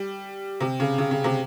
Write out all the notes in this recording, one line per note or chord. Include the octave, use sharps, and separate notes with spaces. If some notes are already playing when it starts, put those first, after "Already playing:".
Already playing: G3
C3
C#3
C#3
C#3
C3